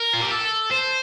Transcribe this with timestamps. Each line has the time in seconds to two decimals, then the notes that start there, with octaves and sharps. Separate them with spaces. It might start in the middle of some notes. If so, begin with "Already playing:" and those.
Already playing: A#4
0.14 F4
0.22 G4
0.31 A4
0.71 C5